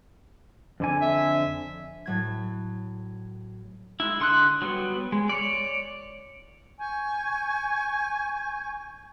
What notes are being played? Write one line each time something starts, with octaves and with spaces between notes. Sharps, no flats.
F2 D3 G#5
E5
A2 F#3 G#6
G#3 E4
D3 C6 D#6 F#6
F#3 G3 B3
G#3
C#5 D5
G#5 C#6 G6